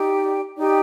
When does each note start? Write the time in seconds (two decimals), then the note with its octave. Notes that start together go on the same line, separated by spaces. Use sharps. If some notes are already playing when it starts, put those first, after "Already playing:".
Already playing: D#4 G4 D5 G5
0.57 D#4 G4 D5 G5